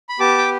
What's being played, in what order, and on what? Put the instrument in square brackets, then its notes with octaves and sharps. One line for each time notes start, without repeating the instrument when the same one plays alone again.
[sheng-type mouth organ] B5
B3 G4 A5 D6
G5